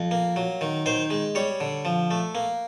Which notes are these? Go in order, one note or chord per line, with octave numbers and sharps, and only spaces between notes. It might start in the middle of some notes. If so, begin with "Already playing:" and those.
Already playing: F2
A#3
F#3
D#3
D#3 C5
G#3
G3 C#5
D3
F3
A3
A#3